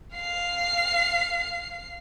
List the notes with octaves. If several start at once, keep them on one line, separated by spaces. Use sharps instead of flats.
F5 C7